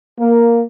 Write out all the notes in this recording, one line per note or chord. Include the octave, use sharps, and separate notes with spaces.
A#3